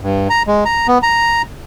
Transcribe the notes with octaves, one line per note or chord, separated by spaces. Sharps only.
G2
A#5
G#3
A#5
B3
A#5